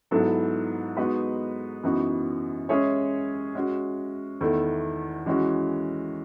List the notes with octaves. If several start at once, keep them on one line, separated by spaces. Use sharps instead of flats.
G#2 F#3 B3 E4 A4
G#3 B3 D#4 F#4 B4
F#2 E3 B3 D#4 F#4
G#3 C#4 G#4 C#5 E5
G#3 C#4 F#4
E2 D#3 A3 E4
E3 G#3 C#4 F#4